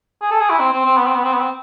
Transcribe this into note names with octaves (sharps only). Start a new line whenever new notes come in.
G#4
A4
G#4
E4
C4
C4
C4
B3
C4
B3
C4
B3
C4